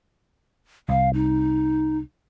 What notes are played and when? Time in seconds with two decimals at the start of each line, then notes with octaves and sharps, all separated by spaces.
0.89 C2 F5
1.14 D#4